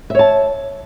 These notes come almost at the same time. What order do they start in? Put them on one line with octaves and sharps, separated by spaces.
E5 C#5 A5